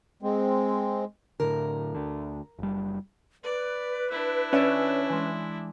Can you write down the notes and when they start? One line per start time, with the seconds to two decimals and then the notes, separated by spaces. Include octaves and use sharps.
0.22 G#3 C4
1.40 A2 D3 A#4
1.95 D2 D3
2.59 F#1 G3
3.44 B4 D5
4.10 D4 E4
4.53 D3 C#4 D5 E5
5.10 E3 G#3